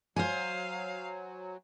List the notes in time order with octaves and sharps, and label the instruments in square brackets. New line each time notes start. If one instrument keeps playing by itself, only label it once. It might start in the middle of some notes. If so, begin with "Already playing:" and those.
[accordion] F#3 [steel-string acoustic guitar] C5 G#5 [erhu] F5